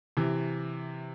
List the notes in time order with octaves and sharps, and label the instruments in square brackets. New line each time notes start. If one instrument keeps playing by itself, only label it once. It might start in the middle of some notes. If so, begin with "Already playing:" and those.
[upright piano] C3 E3